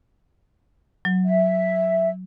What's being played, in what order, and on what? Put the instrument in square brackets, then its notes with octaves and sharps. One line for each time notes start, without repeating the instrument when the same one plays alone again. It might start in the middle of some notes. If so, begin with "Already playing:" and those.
[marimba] F#3
[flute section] E5